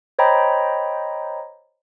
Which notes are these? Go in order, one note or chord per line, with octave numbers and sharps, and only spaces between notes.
C5 C#5 D#5 G5 A#5 B5